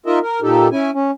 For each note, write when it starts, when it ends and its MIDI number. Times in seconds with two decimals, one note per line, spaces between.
0.06 0.19 63
0.06 0.19 65
0.06 0.19 70
0.06 0.19 75
0.06 0.19 76
0.21 0.40 70
0.42 0.68 46
0.42 0.68 63
0.42 0.68 67
0.42 0.68 69
0.72 0.91 61
0.72 0.91 64
0.72 0.91 80
0.93 1.11 61